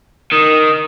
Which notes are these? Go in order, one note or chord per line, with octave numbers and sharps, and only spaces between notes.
D#3